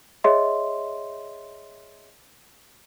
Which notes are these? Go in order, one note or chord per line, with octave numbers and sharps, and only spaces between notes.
G#4 C#5 D#5 E5 C6